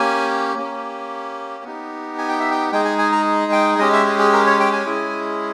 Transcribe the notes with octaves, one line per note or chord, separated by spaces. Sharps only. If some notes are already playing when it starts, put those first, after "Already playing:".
Already playing: A#3 C#4 G4 G#5
A#3 C#4 G4
B3 D#4 G4
G#5
G5
E5
G5
G#3 D#4 G#4 G5
G#5
G#5
A#5
G5
G#3 C#4 G4 D#5
E5
G#4
G#4
A#4
C#5
G5
G#5
G#3 C#4 E4 G#4